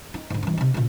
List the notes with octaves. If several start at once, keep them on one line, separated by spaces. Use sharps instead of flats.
D#4
G#2 D3
G2 E3
C3 D#4
A#2 C#3